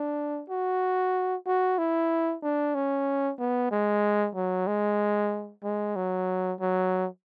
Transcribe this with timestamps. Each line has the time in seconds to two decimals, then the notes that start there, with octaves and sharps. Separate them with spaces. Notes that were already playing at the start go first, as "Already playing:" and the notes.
Already playing: D4
0.49 F#4
1.46 F#4
1.78 E4
2.43 D4
2.75 C#4
3.39 B3
3.71 G#3
4.35 F#3
4.67 G#3
5.63 G#3
5.96 F#3
6.61 F#3